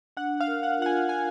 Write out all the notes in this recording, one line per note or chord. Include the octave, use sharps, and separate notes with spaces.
D4 F#5
F5
A#4
F#5
F4 F#5
G#5
A#4 G#5